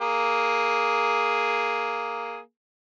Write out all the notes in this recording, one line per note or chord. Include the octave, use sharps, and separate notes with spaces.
A#3 G#4